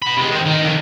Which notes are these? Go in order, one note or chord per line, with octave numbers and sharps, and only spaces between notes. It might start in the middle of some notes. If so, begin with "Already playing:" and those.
F#4 B5
C3 G#3
D#3 C4
D#3 D#4
F2 D#3